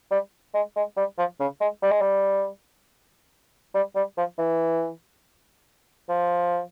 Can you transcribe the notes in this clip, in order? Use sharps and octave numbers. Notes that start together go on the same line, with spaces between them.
G3
G#3
G#3
G3
F3
C#3
G#3
G3
G#3
G3
G3
G3
F3
E3
F3